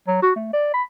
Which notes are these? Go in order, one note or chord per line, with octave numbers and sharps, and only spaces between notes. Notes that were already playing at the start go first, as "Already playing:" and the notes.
F#3
F#4
A3
D5
B5